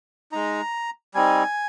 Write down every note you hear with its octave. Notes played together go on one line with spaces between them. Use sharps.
G#3 D#4 A#5
G3 C4 D#4 G#5